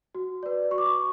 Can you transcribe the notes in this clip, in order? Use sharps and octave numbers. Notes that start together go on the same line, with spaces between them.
F#4
B4 D5
F#4 C#6
D6
C#6